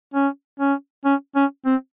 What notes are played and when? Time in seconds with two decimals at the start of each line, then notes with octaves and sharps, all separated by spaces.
0.14 C#4
0.60 C#4
1.05 C#4
1.36 C#4
1.66 C4